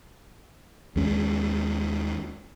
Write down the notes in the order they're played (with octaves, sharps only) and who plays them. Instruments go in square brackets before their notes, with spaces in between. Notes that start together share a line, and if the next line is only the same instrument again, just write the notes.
[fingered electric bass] D#2 G#3 C#4